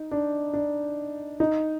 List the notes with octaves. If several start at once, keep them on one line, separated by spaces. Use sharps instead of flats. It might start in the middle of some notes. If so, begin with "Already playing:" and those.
Already playing: D#4
D4
D4
D#4